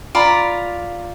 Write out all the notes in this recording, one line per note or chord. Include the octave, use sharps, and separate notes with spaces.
F4 D5 A#5 B5